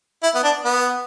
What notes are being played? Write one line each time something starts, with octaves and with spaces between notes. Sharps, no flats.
E4
B3
D4
B3